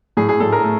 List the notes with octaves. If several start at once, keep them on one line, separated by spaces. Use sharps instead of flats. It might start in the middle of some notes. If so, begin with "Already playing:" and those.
A2 G#4
G#4
A2 A4
A#4
A3